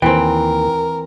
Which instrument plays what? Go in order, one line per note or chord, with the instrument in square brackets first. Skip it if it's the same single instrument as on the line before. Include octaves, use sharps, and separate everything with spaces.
[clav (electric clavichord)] D#2 [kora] E3 C4 [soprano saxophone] A#4 [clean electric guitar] G5